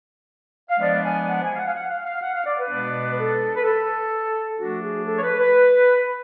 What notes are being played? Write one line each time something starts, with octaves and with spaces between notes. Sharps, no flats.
F5
F3 G#3 B3 D4 D5
G#5
F#5
G#5
F5
F#5
F5
F#5
F5
F5
F#5
F5
D5
B4
B2 G#3 B3 D4
A4
B4
A4
F3 A3 D4 F#4
G#4
A4
C#5
B4
B4